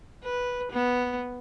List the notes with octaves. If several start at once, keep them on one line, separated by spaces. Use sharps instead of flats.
B4
B3